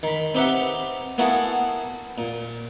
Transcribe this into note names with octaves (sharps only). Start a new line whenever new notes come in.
D#3 B5
C4 D#4 G4 B4 E5 F#5
A#3 B3 E4 F#4 G#4 A4
A#2